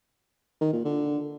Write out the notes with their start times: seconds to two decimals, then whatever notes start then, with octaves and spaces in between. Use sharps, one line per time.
0.61 D#3
0.73 A#2
0.85 D3